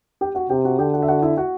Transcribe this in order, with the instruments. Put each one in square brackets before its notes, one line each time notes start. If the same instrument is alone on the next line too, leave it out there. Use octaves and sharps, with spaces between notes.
[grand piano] G4 G5
F#4 F#5
[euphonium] C3 [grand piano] G4 G5
[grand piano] F#4 F#5
[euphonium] D3 [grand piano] G4 G5
[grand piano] F#4 F#5
E5
F#4 F#5
E4 E5
F#4 F#5